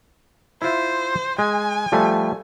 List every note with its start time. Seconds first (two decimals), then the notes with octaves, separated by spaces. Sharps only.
0.62 E4 F4 C5 E5
1.39 G#3 G#5
1.92 F3 G3 A3